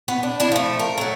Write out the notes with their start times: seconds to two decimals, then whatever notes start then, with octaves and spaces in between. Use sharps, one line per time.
0.08 B3
0.23 D4
0.40 D4 E4
0.52 F3 A3
0.79 A#4
0.98 F#3 A3